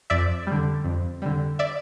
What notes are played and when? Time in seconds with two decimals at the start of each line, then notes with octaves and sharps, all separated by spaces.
0.10 F2 D5 E5
0.47 D3 G3
0.84 F2
1.22 D3 G3
1.59 D5 E5